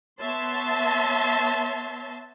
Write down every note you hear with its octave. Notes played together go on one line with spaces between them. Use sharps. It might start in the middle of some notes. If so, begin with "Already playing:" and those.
B3 C#5 E5 A5 C6